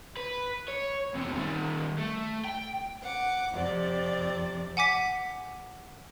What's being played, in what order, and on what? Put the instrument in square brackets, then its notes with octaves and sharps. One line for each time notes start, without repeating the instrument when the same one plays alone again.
[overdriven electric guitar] B4
C#5
E2 C3
D#3 G3
A3
G5
[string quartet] F#5 D6
F2 C3 C4 D5
[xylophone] F#5 G#5 D6 B6